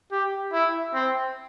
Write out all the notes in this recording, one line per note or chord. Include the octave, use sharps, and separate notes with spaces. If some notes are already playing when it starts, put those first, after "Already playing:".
G4
E4
C4